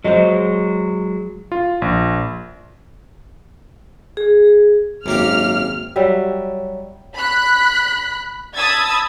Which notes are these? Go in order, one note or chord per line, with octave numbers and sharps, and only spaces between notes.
F#3 G#3 C5 D#5
F4
A#1
G#4
G#1 F#2 A#3 G4 F6
F#3 G3 E5
B5 F#6 B6
A5 B5 D#6 E6 G#6 A6